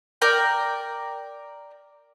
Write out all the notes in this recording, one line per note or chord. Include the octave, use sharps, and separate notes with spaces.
A#4 D5 G5